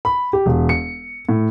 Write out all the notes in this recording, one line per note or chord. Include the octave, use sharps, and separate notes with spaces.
B5
G4
E1
C#7
A2